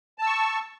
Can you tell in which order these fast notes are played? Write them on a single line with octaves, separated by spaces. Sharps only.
A5 E6 C#6